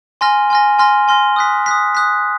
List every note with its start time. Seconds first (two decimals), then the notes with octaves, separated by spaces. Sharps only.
0.21 G#5 C6 F6 A#6
0.50 G#5 C6 F6 A#6
0.79 G#5 C6 F6 A#6
1.08 G#5 C6 F6 A#6
1.36 D#6 F#6 B6
1.66 D#6 F#6 B6
1.95 D#6 F#6 B6